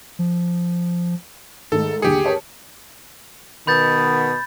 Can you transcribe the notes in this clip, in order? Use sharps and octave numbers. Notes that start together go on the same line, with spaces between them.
F3
G#2 D#3 A3 A4
D#2 D3 G4 G#4 C#7
A#4 C#5 A5
B2 D#3 B3 B5 G6 A6